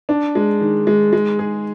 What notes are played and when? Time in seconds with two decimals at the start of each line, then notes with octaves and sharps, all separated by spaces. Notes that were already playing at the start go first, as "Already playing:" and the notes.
0.09 D4
0.35 G#3
0.61 D#3
0.87 G#3
1.13 G#3
1.39 G#4